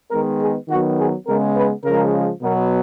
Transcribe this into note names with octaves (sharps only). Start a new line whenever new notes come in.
D#3 G#3 B3 A#4
G#4
D#3 F#3 B3 F#4
G#4
C#3 G#3 B3 A#4
B4
C#3 F3 G#3 A#4
B2 F#3 B3 A#4